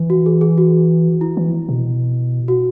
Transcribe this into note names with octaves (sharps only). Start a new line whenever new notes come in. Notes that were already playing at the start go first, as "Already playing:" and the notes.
Already playing: E3
F#4
G#4
G#4
F#4
E4
E3
B2
F#4